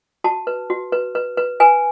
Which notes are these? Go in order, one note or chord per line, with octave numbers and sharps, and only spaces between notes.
F#4 A5
B4
F#4
B4
B4
B4
B4 G#5